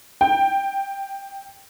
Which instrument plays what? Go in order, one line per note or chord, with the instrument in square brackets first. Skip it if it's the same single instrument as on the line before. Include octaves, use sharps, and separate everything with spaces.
[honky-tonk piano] G5